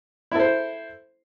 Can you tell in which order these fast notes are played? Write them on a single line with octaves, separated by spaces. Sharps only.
E4 A4 C5